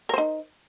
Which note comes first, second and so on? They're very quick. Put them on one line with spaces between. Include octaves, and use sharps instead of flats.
A#4 C5 D#4